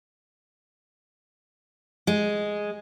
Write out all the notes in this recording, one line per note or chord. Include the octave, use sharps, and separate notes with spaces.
G#3